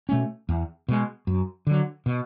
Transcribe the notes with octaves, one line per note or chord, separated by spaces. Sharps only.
B2 A3 C#4
E2
B2 G#3
F#2
D3 F#3
B2